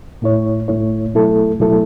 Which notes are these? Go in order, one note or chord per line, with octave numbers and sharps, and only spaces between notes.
A2 A3 E4 C#5
A2 A3 E4 C#5
B2 F#3 A3 E4 A4
B2 F#3 A3 E4 A4